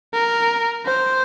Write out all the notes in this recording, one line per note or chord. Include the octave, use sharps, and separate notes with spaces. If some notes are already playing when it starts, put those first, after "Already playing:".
A#4
C5